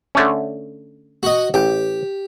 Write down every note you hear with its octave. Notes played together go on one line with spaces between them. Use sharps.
D3 A3 C#4
F#4 D#5
A1 G4 G5